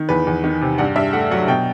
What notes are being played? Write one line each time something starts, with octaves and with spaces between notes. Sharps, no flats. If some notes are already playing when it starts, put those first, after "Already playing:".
Already playing: D#3
E2 B4
E2
D#3
C3
G2 F#5
G2 E5
A3 F#5
F#3 F#5
B2 G5